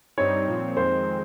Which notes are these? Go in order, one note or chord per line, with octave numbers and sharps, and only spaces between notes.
G2 G3 C4 D#4 C#5
A#2 F3 C4
F2 D#3 G#3 C4 C5